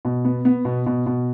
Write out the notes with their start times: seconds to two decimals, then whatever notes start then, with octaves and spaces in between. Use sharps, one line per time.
0.05 B2
0.25 B3
0.45 B3
0.65 B2
0.86 B2
1.06 B2